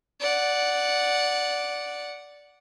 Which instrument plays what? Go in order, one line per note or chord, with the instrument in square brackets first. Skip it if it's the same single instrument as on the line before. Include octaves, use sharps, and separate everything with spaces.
[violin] D5 F#5